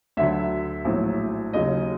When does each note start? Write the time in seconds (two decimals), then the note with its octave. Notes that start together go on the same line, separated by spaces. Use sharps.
0.17 D2 D3 F#3 E5
0.85 A#1 A2 F#3
1.53 D#2 C#3 F#3 D#5